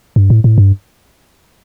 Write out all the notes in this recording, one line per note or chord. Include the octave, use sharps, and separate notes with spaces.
G2
A2
A2
G2